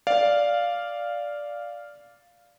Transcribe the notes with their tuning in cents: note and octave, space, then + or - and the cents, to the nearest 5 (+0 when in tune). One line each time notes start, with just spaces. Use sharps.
D5 -5 F5 +0